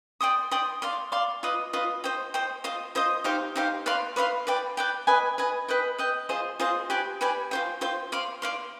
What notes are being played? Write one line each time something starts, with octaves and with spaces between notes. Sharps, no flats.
D5 G5 C6 D#6
D5 G5 C6 D#6
D5 F5 C6
D5 F5 C6
F4 B4 D#5
F4 B4 D#5
C5 D#5 G5
C5 D#5 G5
F4 C5 D#5
F4 C5 D#5
D#4 G4 C5 F5
D#4 G4 C5 F5
B4 D5 F5 C6
B4 D5 F5 C6
B4 D5 G5
B4 D5 G5
B4 D#5 G#5
B4 D#5 G#5
B4 D#5 G5
B4 D#5 G5
F4 G#4 C5 D#5
F4 G#4 C5 D#5
G4 B4 D5 G#5
G4 B4 D5 G#5
F4 C5 G5
F4 C5 G5
D5 F5 C6
D5 F5 C6